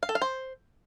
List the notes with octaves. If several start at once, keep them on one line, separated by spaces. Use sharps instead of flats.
F5
A4
F5
C5